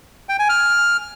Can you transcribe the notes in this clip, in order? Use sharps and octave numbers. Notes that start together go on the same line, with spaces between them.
G5
G#5
F6